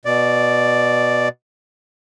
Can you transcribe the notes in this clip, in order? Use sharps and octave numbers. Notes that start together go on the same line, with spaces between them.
B2 D5